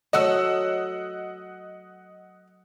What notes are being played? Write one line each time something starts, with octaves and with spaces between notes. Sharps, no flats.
F#3 A3 D#5 F#5 E6